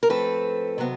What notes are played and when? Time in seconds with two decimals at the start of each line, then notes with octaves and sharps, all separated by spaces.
0.03 A#4
0.09 G#2 F3 A3 C4 A4 B4
0.78 C3 D#3 F#3 B3